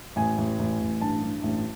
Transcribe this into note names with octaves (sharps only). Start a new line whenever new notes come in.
A1 G#5
A1
A1
A1
G2 A5
G2
A1